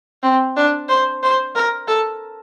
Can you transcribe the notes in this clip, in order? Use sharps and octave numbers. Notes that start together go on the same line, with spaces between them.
C4
D4
C5
C5
A#4
A4